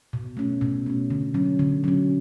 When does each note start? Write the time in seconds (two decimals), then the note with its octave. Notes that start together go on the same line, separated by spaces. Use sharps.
0.13 B2
0.37 A3 C#4
0.61 B2
0.86 A3 C#4
1.10 D3
1.34 F#3 C#4
1.59 D3
1.84 F#3 C#4